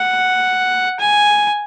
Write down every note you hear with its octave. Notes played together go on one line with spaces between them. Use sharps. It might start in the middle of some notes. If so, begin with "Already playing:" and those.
Already playing: F#5
G#5